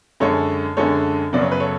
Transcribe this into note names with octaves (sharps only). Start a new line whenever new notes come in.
F#2 D3 G#3 A4 C#5
F#2 D3 G#3 A4 C#5
F#2 C#3 F#3 B3 D5
C#5
B4
A4 C#5